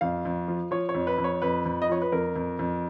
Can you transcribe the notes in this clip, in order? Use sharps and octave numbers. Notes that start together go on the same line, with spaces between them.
F2 F5
F2
F3
F3 C#5
C#5
F2
B4
F2
C#5
F2 B4
F2
D#5
F3 C#5
B4
F2 A#4
F2
F2